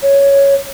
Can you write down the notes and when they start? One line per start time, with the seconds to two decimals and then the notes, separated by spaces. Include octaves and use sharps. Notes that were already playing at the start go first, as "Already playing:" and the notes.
0.03 C#5